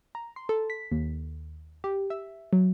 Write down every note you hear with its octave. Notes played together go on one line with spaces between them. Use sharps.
A#5
C6
A4
B6
D#2
G4
E5
F#3